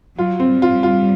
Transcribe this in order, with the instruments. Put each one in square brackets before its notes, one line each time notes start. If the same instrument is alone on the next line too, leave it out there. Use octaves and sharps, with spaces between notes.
[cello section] F#3 [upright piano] F4
[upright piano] C4
[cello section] G3
[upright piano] F4
F4